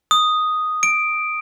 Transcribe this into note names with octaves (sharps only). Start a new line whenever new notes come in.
D#6
D7